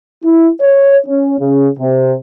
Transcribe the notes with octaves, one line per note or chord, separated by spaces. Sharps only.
E4
C#5
C#4
C#3
C3